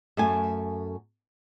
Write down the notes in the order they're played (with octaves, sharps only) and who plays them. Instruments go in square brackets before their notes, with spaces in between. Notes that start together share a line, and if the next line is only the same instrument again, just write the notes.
[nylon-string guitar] F#2 A3 G#5